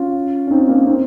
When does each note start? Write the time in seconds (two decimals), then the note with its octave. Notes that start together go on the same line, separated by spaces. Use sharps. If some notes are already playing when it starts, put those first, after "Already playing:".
Already playing: C#4 F4
0.47 C#4
0.51 C4 D#4
0.68 A#3 C#4
0.87 C4 D#4